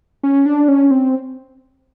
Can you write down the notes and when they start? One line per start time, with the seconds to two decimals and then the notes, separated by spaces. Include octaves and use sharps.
0.23 C#4
0.46 D4
0.68 C#4
0.91 C4